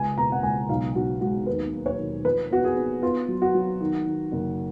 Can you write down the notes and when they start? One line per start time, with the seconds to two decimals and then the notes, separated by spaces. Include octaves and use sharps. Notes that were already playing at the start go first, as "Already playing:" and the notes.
Already playing: C#2 G#5
0.17 B2 A#5
0.32 F#5
0.43 C#2 G#5
0.69 B1 F5
0.95 B1 F#4
1.21 G#3 F#4
1.47 D#2 B4
1.73 A#3
1.86 C#5
1.99 D#2
2.24 F3 B4
2.51 B3 F#4
2.64 G#4
2.77 B3
3.03 B3 F4
3.28 F#3
3.42 F#4
3.55 F#3
3.81 D#3
4.06 D#3
4.32 F#1